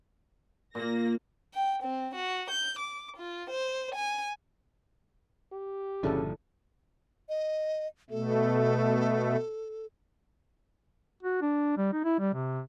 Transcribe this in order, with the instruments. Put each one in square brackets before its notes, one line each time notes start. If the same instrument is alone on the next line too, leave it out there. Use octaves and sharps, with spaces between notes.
[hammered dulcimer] A#2 [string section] A#3 A#6
[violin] G5
C4
F#4
G6
D6
F4
C5
G#5
[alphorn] G4
[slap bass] G1 A#2 F3 [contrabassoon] C#3 [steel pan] D4 E4 A4
[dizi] D#5
[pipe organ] B2 A3 [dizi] A4
[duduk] F#4
D4
G3
D#4
E4
G3
C3